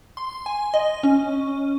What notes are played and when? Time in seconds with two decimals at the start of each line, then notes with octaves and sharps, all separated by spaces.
0.17 C6
0.46 G#5
0.74 D#5
1.03 C#4